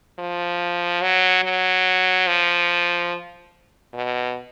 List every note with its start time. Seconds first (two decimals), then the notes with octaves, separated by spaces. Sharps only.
0.19 F3
1.02 F#3
1.44 F#3
2.27 F3
3.94 B2